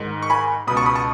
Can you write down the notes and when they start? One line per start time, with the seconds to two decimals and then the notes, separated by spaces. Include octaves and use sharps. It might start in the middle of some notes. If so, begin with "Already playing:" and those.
Already playing: G#2 D#3
0.23 C#6
0.30 G#5 B5
0.67 C#2 B2 B5 D#6
0.77 A5 C#6
0.86 B5 D#6
0.95 A5 C#6